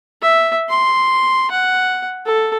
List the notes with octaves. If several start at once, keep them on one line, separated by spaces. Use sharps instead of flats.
E5
C6
F#5
A4